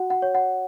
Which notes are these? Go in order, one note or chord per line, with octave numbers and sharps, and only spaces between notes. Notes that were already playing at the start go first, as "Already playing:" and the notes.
Already playing: F#4 F#5
F#5
C#5
F#5